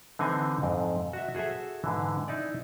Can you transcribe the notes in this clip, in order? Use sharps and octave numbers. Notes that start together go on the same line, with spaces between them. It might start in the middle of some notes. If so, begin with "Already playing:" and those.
D3 E3 C4 D#4 G#5
F2 G#2
F#4 E5
F#4 G#4 A4 C5 E5
G#2 D3 E3
D#4 E4 D5